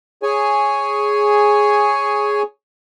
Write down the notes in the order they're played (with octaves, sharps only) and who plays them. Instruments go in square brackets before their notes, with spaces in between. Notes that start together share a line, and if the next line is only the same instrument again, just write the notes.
[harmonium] G#4 C#5 G#5